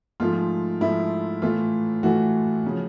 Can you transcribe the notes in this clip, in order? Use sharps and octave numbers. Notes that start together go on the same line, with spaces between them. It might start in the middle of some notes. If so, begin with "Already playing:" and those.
G#2 F3 A3 F4
G#2 F3 A3 E4
A2 E3 A3 F4
A2 E3 A3 F#4
C#3 F3